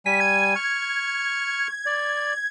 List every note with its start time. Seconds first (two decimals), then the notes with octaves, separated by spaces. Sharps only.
0.06 G3 G#5 B6
0.20 G#6
0.56 C#6 F6
1.86 D5